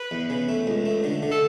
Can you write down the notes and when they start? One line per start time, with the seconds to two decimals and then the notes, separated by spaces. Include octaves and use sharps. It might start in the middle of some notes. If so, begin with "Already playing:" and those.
Already playing: B4
0.11 E2
0.30 C#3
0.49 A3
0.67 C#2
0.86 A3
1.04 D3
1.22 D3
1.31 A4